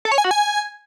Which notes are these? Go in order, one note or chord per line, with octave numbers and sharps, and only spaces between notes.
A4
C#5
G#5
F#4
G#5